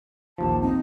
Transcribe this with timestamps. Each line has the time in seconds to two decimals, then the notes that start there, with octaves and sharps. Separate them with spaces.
0.38 A#1 D#2 F3 A5
0.62 C4 D#4